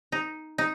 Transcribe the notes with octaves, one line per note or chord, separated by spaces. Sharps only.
D#4
D#4